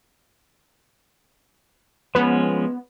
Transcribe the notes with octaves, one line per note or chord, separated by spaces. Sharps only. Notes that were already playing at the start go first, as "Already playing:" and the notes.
F3 G#3 B3 C#4